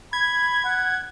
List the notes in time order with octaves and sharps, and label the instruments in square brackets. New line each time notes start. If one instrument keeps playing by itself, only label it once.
[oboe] B5 [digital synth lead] G#6
[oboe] F#5